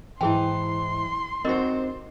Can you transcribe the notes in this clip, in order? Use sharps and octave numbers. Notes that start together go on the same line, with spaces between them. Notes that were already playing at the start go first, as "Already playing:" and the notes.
G#2 E3 E4 G#4 G5 C6
C4 D#4 F#4 G4 A#4 C5 D#5